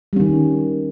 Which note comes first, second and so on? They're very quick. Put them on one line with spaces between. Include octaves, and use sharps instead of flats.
G3 C#4 D#3